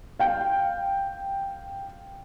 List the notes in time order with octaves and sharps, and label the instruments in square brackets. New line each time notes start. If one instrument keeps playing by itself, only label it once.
[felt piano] F5 G5